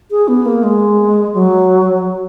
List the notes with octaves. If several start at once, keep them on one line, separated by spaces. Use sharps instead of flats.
G#4
B3
A#3
G#3
F#3